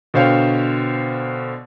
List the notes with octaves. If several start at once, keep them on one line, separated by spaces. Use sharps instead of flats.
B2 D3 C5 C#5 F5 G5